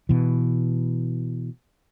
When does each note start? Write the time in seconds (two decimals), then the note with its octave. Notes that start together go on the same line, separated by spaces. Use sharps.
0.09 B2 E3